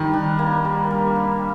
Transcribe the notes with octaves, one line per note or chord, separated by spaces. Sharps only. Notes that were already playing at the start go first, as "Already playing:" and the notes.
Already playing: D#3 G3
D4
A#3
G3
G3
D4